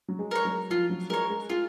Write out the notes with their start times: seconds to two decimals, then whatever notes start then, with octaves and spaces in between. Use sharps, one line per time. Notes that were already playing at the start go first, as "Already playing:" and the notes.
0.08 F#3
0.19 G#3
0.31 A#4 C#5
0.45 F#3
0.70 F3 F4
0.90 F#3
1.10 G#3 A#4 C#5
1.29 G#3
1.50 G#3 F4